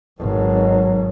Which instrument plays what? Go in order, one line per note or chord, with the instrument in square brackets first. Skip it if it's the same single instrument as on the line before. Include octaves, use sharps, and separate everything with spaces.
[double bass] G#1 B2 [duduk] F#3